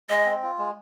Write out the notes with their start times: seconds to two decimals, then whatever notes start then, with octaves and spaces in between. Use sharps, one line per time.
0.09 G#3 D#5
0.26 C4
0.43 F4
0.59 G#3